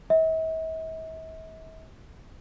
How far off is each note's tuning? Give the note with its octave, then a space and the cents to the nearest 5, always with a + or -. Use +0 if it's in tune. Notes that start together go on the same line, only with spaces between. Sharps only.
E5 -45